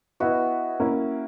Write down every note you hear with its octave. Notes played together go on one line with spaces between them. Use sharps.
B3 E4 F#4 B4 D#5
A#3 C#4 E4